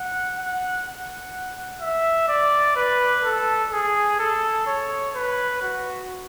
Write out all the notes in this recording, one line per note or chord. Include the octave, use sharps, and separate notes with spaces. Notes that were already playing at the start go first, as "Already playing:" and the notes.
Already playing: F#5
F#5
F#5
E5
D5
B4
A4
G#4
A4
C#5
B4
F#4